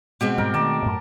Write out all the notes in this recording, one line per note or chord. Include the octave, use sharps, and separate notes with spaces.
B2 G#3 C4 G4
G#2 G3 A#4
D#3 E3 A3 A#4 D5 A5
F#2 A2